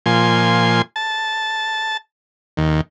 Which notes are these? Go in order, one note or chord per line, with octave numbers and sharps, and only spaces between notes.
A#2 F3 G#5 C6
A5
D#2